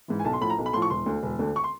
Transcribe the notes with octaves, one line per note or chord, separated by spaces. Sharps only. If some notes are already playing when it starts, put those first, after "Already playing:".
G#2 E3
G#5
B1 A5
C6
A2 F3 B5
A#5
B1
B5
A2 F3 C6
C#6
E1 C6
D2 D3
E1
D2 D3
C#6
C6